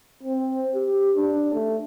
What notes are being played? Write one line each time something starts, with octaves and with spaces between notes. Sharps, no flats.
C4
G4
D4
A3